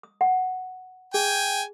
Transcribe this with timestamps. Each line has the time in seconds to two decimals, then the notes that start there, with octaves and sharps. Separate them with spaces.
0.03 D#6
0.21 F#5
1.14 G#4 G5 G#5